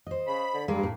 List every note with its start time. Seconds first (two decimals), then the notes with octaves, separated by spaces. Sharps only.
0.07 C5 D#5
0.27 C#3 B5
0.54 D3
0.68 G2 G#3 A#3
0.83 A2